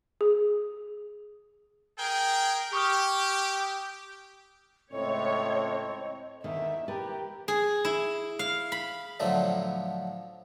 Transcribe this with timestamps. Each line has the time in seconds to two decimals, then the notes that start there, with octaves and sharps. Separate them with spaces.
0.21 G#4
1.99 G#4 A#4 G5
2.73 G4 C#6 D#6 F6
4.92 C#2 A2 C4 C#5 D#5
6.44 E2 D3 D#3 E5
6.88 G4 A#4 B4 A5
7.48 G#4
7.85 E4
8.39 F5
8.72 B5
9.20 A2 D3 F3 F#3 A3